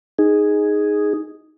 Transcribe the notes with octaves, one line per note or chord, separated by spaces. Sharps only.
D#4 G#4